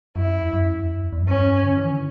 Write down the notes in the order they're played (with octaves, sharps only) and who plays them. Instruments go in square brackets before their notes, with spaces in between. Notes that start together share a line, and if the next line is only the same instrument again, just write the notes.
[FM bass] F#2 [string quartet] E4
[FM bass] E2
F#2
E2
F#2
E2
F#2
[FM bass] G2 [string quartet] C#4
[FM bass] D3
E3
D3